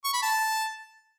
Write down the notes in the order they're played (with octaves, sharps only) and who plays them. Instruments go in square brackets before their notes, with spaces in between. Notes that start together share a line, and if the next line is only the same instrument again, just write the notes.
[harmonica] C#6
B5
A5